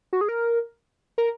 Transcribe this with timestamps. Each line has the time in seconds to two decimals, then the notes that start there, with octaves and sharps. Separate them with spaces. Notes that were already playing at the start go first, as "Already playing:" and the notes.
0.13 F#4
0.21 G#4
0.29 A#4
1.18 A#4